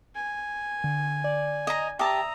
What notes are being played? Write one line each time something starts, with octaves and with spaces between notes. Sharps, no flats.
G#5
D3
D5
D#5 A#5
G4 E5 A5 A#5 D#6 E6